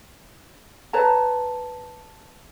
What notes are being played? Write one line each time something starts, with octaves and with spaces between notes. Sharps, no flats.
B4 C#5 A5 A#5